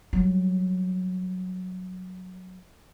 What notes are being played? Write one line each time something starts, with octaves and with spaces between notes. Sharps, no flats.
F#3 G3